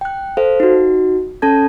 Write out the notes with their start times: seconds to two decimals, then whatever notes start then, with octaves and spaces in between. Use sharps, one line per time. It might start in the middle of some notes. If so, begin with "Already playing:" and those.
0.01 G5 F#6
0.37 A4 C5 F5
0.60 D#4 F#4
1.42 C#4 A4 A5 G#6